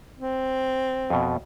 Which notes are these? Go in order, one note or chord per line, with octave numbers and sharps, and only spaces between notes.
C4
F2 B2